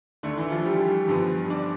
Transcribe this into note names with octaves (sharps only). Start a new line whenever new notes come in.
D2 D3 A3 D4
E3 E4
F3 F4
G3 G4
G2 D3 F3 B3
D4 D5